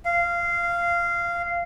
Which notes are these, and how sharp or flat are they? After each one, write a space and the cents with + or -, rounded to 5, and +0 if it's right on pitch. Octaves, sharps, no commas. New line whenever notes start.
F5 -15